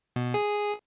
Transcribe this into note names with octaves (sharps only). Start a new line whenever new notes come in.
B2
G#4